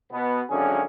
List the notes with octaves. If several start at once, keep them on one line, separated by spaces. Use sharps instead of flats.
B2 B3
G#1 F#2 D3 A#3 C#4 G#4